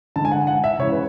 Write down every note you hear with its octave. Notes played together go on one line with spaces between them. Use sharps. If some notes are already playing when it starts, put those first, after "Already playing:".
D3 G#3 A5
G#5
F#5
F#5
E5
C#3 E3 G#3 C#5
B4